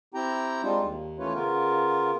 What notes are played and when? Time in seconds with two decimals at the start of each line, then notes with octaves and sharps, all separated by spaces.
0.14 C4 E4 G4 G5 A#5
0.63 G3 G#3 C4 D4 D#4 F4
0.82 D#2
1.19 E3 A3 C#4 F4 B4 C#5
1.34 C#3 B3 F4 A#4